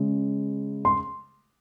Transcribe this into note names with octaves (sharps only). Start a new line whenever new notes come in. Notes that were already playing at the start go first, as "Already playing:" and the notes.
Already playing: C#3 G#3
C6